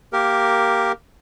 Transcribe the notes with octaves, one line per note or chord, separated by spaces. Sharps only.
A#3 G4 A#4